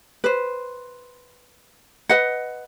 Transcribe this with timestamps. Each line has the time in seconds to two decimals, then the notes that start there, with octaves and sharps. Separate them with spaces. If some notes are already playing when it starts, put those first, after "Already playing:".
0.24 B4 C5
2.09 B4 D#5 F#5